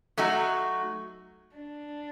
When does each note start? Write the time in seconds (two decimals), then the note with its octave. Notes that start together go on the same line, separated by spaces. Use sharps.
0.17 F#3 A3 D#4 F#4
1.55 D4